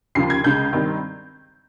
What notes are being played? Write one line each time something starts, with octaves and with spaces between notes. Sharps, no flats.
D#2 C#3 F3 C7
G#6
C#2 C#3 G#3 G6
G2 D#3 G3 C4 D#4